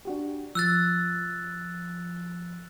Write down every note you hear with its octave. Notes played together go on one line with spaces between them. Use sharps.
D4 F#4 G4
F3 E6 F#6 A6